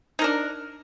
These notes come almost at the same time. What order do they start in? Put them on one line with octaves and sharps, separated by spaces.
D#4 A#4 D4